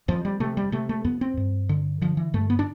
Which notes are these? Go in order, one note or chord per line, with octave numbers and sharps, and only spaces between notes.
F2 F3
G3
C3 A3
G3
C3 A3
A3
F2 B3
C4
G2
D3
D3 F3
E3
G2 A3
B3
D4